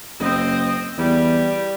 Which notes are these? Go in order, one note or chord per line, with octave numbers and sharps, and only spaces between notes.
F#1 C4 D#5
E2 G3